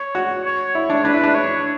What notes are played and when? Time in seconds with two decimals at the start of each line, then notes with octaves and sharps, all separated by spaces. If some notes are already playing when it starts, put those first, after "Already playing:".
Already playing: C#5
0.15 F#4
0.45 C#5
0.75 E4
0.90 D4
1.05 D4 B4
1.14 E4
1.24 D4
1.34 C#5